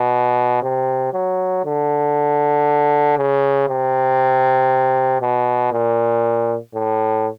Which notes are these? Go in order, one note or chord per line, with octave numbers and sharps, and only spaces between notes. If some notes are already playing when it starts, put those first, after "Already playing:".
Already playing: B2
C3
F#3
D3
C#3
C3
B2
A#2
A2